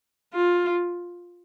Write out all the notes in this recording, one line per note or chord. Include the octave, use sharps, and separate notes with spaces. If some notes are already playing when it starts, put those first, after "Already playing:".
F4